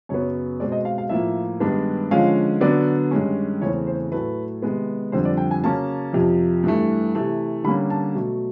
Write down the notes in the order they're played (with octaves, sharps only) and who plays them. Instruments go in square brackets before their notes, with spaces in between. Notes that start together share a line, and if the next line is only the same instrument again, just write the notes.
[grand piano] F#2 C#3 F#3 B3 C#5
B2 G#3 C4 D5
D#5
F5
F5
A2 F3 A#3 E5
G2 D#3 G#3 B3 D4
D3 F3 G#3 C#4 F5
D3 F#3 B3 D5
G2 D#3 G#3 C#4
E2 C#3 E3 A3 C4 C#5
C5
A2 F#3 A3 B4
C3 D#3 G#3 B3
F2 D3 G3 C4 C5
D5
G5
G#5
C#3 F#3 A#3 C#4 A5
F2 C3 F3
G2 E3 A3
C3 E3 A3
D3 G3 A#3 C#4 B5
A5
B2 F#3 A3